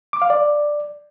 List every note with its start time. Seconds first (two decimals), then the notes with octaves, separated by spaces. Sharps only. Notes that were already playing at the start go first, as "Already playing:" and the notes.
0.13 D6
0.22 F5
0.30 D5